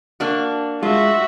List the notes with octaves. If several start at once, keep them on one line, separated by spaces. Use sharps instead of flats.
A#3 D4 F#4
G#3 F4 F#4 E5